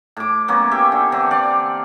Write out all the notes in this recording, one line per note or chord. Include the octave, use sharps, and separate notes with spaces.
A2 D6
F#3 A#3 B3 C#4
G4 E5 G5 G#5
D3
D3 E3 C4
D5 F5